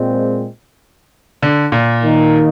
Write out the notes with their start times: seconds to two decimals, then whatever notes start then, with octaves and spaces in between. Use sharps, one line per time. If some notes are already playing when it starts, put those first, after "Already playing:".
Already playing: A#2 G#3 C4
1.43 D3
1.72 A#2
2.03 D#3 A#3 D#4